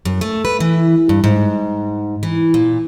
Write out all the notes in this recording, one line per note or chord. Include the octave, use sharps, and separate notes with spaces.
F#2
A3
B4
E3
G2
G#2
E3
A#2